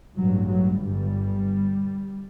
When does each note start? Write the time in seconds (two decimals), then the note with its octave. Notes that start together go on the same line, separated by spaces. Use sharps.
0.18 A1 G2 F#3
0.51 F#3
0.83 G1 G2 G3